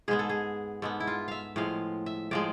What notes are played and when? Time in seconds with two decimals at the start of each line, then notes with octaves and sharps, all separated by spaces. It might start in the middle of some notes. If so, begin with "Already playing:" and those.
0.08 G#2 G#3 B3 G#4
0.19 A4
0.30 G#4
0.82 G#2 G#3 B3 A4
1.00 E4
1.07 F4
1.28 E5 F5
1.56 A2 F3 G#3 F5
2.06 E5
2.31 A2 F3 G#3 D5